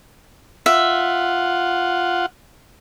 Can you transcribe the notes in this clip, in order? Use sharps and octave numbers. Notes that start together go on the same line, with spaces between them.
F4 E5 F#5